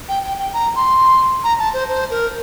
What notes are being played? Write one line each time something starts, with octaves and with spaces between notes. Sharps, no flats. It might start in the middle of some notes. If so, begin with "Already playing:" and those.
G5
G5
G5
A#5
C6
A#5
A5
C5
C5
A#4